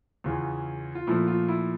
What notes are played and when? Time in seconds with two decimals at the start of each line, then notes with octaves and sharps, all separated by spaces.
0.24 E2 C#3 E3 F4
0.95 F4
1.07 A#2 F3 A3 E4
1.28 F4
1.48 E4